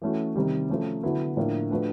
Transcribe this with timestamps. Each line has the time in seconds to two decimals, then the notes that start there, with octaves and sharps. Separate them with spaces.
0.02 E3 A3 C#4 F#4
0.35 C3 D#3 G3
0.69 F3 A3 C#4
1.03 D3 F#3 B3 E4
1.37 A2 F3 A#3 D4
1.71 F3 A3 D4 F#4 B4